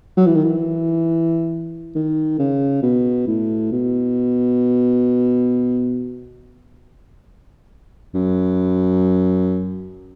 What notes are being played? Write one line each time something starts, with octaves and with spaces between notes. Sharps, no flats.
F#3
E3
D#3
E3
D#3
C#3
B2
A2
B2
F#2